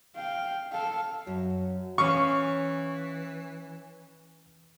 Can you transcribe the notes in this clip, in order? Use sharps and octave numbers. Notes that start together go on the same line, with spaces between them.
F5 G5
A4 F5
F#2 F#3
E3 C#4 F5 C#6